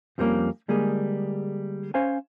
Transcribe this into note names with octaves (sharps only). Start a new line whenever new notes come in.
F2 F3 G3 G#3 A#3 C#4
D3 G3 G#3 A#3 G#4
C#4 C5 F5 G#5